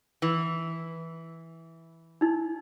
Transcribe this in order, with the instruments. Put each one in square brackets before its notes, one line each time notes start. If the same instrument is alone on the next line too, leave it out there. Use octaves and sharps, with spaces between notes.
[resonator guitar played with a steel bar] E3
[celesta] D#4 E4